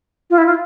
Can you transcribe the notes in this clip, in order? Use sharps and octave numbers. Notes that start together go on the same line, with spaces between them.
F4
E4
F4